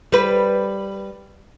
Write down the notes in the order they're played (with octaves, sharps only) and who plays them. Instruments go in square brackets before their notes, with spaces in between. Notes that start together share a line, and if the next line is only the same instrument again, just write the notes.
[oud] G3 B4